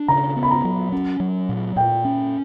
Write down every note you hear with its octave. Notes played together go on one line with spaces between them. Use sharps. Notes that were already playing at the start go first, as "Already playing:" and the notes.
Already playing: D4
C#3 A#5
B3
B5
A#5
F#3
C#4
F#3
A#2
A#2 G5
C#4